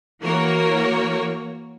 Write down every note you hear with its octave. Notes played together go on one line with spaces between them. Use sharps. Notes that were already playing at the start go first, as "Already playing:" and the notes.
E3 A#3 F#4 A#4 C#5